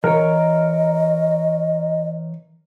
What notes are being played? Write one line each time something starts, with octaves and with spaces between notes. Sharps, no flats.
E3 A#4 C#5 D#5